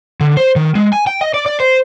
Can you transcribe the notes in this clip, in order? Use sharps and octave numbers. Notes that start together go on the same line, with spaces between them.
D3
C5
D#3
G#3
G#5
G5
D#5
D5
D5
C5